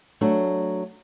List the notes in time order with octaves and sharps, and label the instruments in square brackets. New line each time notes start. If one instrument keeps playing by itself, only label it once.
[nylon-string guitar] F#3 A3 D4